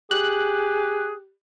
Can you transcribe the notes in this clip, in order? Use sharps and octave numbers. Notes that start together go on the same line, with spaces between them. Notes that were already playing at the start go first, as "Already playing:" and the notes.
G4 G#4 F#6